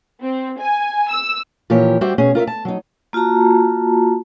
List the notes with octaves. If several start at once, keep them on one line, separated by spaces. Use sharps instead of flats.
C4
G#5
E6
A#2 E3 F3 G4 A#4 C#5
G3 F#4 G4 C5 E5
B2 C#4 G#4
F4 A#4 C#5 E5
A5
F#3 D#4
A#3 F4 F#4 A5 A#5